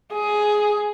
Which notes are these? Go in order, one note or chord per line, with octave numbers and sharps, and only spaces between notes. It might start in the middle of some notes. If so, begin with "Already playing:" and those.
G#4